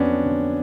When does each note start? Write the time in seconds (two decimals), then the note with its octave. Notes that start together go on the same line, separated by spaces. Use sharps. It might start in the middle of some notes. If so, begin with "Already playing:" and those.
Already playing: F2 F#3 B3 C#4 D4
0.25 D3